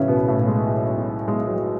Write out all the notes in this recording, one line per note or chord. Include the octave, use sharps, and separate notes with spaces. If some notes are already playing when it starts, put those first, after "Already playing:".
Already playing: A2 C#3 E3 F#3 C#4
B1 B2 B3
A2 A3
B1
G#3
F#3
B1
B1 G#3
F#3
F#3